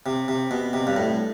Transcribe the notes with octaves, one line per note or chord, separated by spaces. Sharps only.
C3
C3
B2
C3
G2
A2